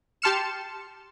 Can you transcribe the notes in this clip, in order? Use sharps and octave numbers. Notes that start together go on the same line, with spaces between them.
G4 A5 C6 F6 C#7 E7